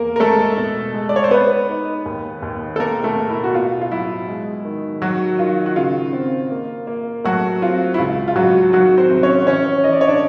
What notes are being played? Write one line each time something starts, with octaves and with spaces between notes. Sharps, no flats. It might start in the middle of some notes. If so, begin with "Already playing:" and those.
Already playing: E2 A#3 A#4
A#4
G#3 A3 A4
B2
G#3
D5
C#5
C5
B3 B4
D#4
D#2
D#2
A4
B2 A#3 A#4
A3 A4
B2
E4
F#4
B2 F4
F4
F#3 E4
G#3
D#3
D#3 F#3 F#4
D#3 F4
F#4
C#3 F4
C4
A#3
A#3
F#3 A3 F#4
C4 F4
E4
C#2 F4
F4
C#2 F#3 F#4
D#3 F#3 F#4
C4 C5
C2
C#4 C#5
E3 C#4 C#5
E3 D#5
D5
C#5
D4 D5